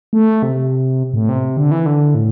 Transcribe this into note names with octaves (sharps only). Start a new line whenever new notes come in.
A3
C3
A2
C3
D3
E3
D3
A2